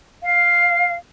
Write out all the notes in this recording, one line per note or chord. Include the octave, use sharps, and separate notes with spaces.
F5